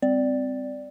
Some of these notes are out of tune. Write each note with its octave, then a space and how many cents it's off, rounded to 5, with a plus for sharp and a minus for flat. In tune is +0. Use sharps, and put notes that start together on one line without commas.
G3 +35 C4 -20 D5 +0